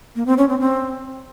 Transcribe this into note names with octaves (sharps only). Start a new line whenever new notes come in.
A#3
C4
C#4
C4
C4